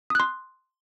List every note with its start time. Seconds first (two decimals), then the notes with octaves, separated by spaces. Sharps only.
0.10 D#6
0.15 F#6
0.20 C6